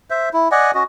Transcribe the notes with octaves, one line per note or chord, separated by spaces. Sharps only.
C5 E5
E4
D5 D#5 F#5 G#5
C#4 F#4 D#5